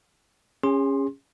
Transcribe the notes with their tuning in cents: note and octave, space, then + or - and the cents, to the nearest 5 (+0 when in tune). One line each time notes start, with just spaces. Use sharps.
C#4 -5 G#4 -35 C6 +15